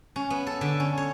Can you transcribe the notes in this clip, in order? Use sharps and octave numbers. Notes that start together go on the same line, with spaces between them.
C#4
B3
A4
D3
C#4
C#5